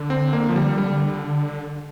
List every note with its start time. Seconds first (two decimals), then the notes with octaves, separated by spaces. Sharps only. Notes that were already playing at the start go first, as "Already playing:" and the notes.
Already playing: D3
0.10 C4
0.33 A#3
0.49 F3
0.56 G3
0.78 G3